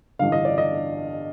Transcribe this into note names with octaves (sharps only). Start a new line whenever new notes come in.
A1 G2 D3 F5
D#5
D5
D#5